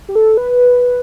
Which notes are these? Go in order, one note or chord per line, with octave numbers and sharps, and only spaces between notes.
G4
A4
B4